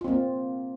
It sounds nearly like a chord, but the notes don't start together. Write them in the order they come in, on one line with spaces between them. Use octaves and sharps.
F4 C4 A#3